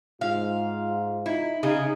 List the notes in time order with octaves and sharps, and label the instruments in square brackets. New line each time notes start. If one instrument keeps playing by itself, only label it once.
[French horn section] G#2 F4 [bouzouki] F5
[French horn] D#4 [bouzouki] E4
[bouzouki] C#3 G#4 [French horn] D#4